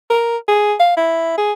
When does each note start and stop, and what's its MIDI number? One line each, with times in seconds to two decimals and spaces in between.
0.10 0.37 70
0.48 0.75 68
0.80 0.96 77
0.97 1.34 64
1.38 1.52 68